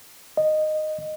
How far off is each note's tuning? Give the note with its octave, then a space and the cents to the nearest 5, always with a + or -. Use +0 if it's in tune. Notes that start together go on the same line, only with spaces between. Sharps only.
D#5 -10